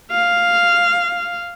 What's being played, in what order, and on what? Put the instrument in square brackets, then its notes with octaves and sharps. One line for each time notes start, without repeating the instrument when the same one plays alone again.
[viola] F5